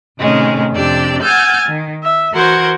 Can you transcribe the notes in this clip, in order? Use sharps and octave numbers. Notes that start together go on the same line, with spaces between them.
A2 C3 D#3 G#3 C#4
F2 C3 D4 G4 D5 E6
F#5 G#5 E6 F6 G6 A6
D#3
E5
E3 F#4 A#4 C5 F#5 G#6